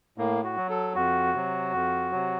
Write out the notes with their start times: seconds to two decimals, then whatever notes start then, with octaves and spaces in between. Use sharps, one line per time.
0.18 A2 A#3
0.44 F#4
0.57 F#3
0.70 A4
0.95 F2 F#4
1.34 C3 F#3
1.73 F2
2.12 C3 F#3